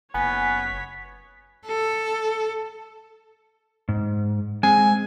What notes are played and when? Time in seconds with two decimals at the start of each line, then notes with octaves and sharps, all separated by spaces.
0.14 F#1 B3 C#5 G#5 B6
1.66 A4
3.89 G#2
4.63 G#3 C4 G#5